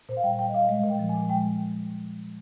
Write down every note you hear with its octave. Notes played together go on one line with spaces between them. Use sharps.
A#2 C5
F5
G3 G5
G3 G5
D#5
A#2 F5
G#3 D#5
A#2
G5
F3
A#2 G#5
G#3 G5